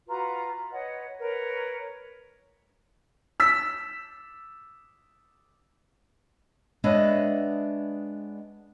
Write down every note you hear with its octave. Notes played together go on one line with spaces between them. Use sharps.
F4 F#4 B4 A#5
B4 C#5 D#5 F#5
A#4 B4 C#5
E6 B6
G#3 B3 D4 C#5 D#5 E5